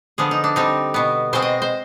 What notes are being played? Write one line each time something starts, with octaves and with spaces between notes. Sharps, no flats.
D3 F3 B3 G#4
D#4
D4
D3 G3 C4 D#4
B2 B3
B2 G#3 C4 C5
D#5
C5